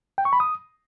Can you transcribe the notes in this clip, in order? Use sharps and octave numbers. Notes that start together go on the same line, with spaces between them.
G5
C#6
B5
D#6